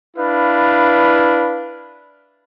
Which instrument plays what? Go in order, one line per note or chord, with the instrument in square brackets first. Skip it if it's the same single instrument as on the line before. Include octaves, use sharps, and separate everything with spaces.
[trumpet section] D4 E4 B4 F5